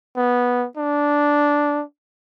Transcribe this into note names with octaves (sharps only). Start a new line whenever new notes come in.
B3
D4